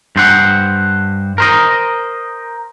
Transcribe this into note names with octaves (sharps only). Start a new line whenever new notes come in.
G2 C5 F#5
A#4 C5 D#5